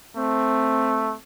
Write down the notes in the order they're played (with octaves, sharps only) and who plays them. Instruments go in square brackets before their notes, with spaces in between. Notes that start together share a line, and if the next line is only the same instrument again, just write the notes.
[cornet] A3 [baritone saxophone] C4